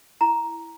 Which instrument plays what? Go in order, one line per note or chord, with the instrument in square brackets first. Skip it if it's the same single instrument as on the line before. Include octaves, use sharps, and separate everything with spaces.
[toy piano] E4 A#5